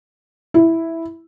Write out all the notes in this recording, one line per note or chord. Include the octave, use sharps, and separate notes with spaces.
E4